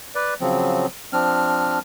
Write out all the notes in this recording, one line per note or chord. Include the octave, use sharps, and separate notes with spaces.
B4 D5
C#3 F3 F#3 C4
F3 C4 D4 F6